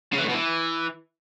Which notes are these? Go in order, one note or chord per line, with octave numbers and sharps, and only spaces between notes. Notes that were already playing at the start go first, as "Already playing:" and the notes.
C#3
E3
A2
B2
E3